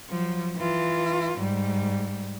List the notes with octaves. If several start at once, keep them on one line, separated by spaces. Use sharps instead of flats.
F3 F#3
E3 F4
G#2 G3